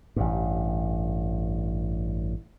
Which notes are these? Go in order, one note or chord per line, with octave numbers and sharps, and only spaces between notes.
A1 G2